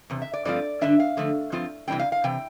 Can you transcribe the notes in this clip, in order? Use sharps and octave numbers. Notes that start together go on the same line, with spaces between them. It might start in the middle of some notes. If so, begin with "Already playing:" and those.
E2 C3
E5
D5
G2 F3 A3 C4 F4 D5
G2 D3 G3 D4 E5
F5
D3 F3 A3
G2 F3 C4 F4
C3 E3 G3 C4 G5
F5
F5
C3 E3 G5